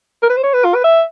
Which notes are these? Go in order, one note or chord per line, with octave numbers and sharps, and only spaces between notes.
A#4
B4
C5
C#5
B4
F4
B4
E5